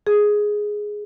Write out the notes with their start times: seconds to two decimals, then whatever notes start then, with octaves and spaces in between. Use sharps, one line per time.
0.07 G#4